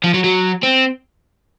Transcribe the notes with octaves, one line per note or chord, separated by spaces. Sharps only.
F3
F#3
F#3
C4